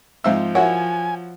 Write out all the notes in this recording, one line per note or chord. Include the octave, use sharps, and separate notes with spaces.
G#2 F3 C4 E5 F5 E6
E4 F#4 A#4 C#5 F#5 G#5